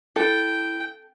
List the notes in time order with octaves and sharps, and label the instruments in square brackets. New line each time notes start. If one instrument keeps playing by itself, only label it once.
[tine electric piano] E4 [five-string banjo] A4 [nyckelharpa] G5